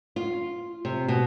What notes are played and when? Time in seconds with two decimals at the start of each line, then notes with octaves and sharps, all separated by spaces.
0.16 F4
0.85 C3
1.08 B2